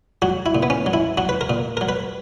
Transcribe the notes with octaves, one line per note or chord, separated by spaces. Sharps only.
F#3 F#4
E4
A#2
B3
C#4
F#3
E4
F#3 F#4
B4
A#4
A#2
F#3 A#4
B4